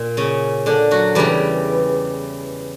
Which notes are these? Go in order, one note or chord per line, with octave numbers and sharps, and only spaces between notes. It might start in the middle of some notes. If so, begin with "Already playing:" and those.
Already playing: A#2
C#3 C#4
D3 D4
F#3 F#4
E2 C#3 E3 G3 G4